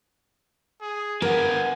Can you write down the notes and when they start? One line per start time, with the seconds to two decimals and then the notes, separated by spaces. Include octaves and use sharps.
0.82 G#4
1.22 D3 B3 A#4 G#5